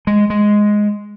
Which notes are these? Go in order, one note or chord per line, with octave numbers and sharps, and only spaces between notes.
G#3
G#3